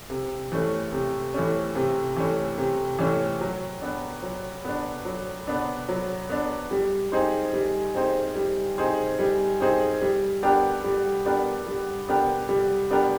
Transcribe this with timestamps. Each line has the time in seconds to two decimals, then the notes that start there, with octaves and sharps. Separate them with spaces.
0.10 C3
0.52 E3 A3 C#4
0.92 C3
1.34 E3 A3 C#4
1.75 C3
2.17 E3 A3 C#4
2.58 C3
2.99 E3 A3 C#4
3.41 F#3
3.81 B3 D4
4.22 F#3
4.65 B3 D4
5.05 F#3
5.47 B3 D4
5.89 F#3
6.29 B3 D4
6.71 G3
7.12 C4 D#4 G#4 C5
7.53 G3
7.95 C4 D#4 G#4 C5
8.36 G3
8.78 C4 D#4 G#4 C5
9.19 G3
9.60 C4 D#4 G#4 C5
10.02 G3
10.43 B3 D4 G4 A#4
10.84 G3
11.25 B3 D4 G4 A#4
11.67 G3
12.08 B3 D4 G4 A#4
12.49 G3
12.90 B3 D4 G4 A#4